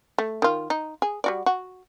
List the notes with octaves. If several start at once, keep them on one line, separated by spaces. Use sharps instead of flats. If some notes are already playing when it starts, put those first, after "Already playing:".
A3
D#3 F4
D#4
G#4
G3 F#4 D5
F#4